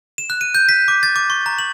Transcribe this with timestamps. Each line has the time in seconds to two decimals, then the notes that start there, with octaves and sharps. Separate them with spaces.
0.18 E7
0.30 F#6
0.41 D#7
0.55 G6
0.69 B6
0.88 D6
1.03 A6
1.16 D6
1.30 C#6
1.46 A#5
1.58 F#7